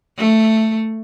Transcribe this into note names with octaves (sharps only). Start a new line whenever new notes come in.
A3